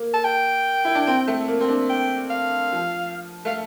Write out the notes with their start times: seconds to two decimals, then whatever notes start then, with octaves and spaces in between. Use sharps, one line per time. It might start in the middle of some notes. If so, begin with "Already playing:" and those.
Already playing: A#3
0.14 A5
0.24 G5
0.85 E4
0.95 D4
1.07 C4
1.28 A3
1.48 A#3
1.61 C4
1.68 D4
1.90 G5
2.30 F5
2.72 F3
3.45 A3 F5